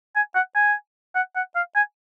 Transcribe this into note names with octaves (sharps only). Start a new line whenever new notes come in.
G#5
F#5
G#5
F#5
F#5
F5
G#5